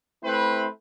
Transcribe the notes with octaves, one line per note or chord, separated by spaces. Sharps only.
A3 C4 E4 B4 C5